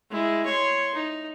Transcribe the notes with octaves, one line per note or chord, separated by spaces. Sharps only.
G#3 E4
C#5 C6
D#4